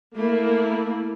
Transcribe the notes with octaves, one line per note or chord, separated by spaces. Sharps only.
A3 A#3 E4